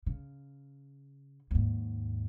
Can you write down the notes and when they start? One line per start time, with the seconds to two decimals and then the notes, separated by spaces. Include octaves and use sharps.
0.06 C#3
1.51 D#2 G#2